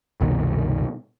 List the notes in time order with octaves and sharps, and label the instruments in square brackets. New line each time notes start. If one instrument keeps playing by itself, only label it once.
[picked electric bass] F#1 C2 B2 D#3